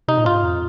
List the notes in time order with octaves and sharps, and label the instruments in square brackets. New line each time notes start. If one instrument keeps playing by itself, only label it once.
[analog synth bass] C3 [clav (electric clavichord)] D#4
[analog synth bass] A#2
[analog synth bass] G#2 [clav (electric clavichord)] F4
[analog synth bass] F2